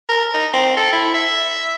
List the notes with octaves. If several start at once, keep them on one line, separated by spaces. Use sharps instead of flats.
A#4
D#4
C4
A4
E4
E5